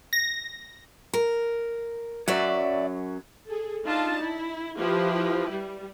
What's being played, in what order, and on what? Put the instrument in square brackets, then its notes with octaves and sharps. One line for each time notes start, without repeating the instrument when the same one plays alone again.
[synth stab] A#6
[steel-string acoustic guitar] A#4
[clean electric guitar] F#2 F#3 [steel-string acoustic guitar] D5 E5
[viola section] G#4 A4
D4 D#4 F4 A5
E4
F3 E4 G4 B4
G3